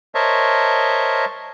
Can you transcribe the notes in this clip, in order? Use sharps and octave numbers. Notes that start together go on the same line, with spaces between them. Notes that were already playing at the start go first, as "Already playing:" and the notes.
A#4 C5 C#5 D#5 E5 A5